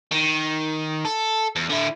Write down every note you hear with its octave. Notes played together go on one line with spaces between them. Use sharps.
D#3
A4
E2
D3 E4